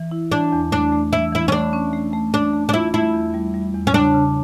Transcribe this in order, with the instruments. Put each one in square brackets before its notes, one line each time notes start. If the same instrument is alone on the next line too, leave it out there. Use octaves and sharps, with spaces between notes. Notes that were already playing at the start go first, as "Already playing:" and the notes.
Already playing: [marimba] E3
E4
[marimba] E3 [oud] D4
[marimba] E2
[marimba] A3 [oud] D4
[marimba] A3
[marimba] E3 [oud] E4
[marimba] E3 [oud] E4
[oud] C#4
[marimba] A3 [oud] D4
[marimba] C#4
A3
A3
[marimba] A3 [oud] D4
[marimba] A3
[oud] D4
[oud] E4 [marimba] F4
[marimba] A3 [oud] E4
[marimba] E2
G3
G3
E2
[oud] C#4
[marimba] C#3 [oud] D4
[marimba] C#3